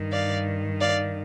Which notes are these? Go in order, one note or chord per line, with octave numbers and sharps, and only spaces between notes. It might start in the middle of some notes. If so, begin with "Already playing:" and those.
Already playing: G2 D#3
D5 F5
D5 F5